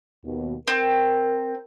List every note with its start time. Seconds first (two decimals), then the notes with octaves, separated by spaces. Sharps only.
0.24 D#2 B2
0.68 C4 A#4